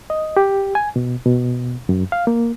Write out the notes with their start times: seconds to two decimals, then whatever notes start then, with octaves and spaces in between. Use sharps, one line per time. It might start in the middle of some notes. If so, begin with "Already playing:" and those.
0.10 D#5
0.37 G4
0.75 G#5
0.96 B2
1.26 B2
1.89 F#2
2.12 F5
2.27 A#3